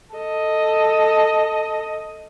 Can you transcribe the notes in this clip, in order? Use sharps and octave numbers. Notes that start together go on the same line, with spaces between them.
A4 D#5